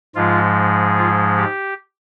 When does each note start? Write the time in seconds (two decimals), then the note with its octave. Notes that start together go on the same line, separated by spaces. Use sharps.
0.15 G#2 F3 G#3 F4
0.97 F4
1.37 G4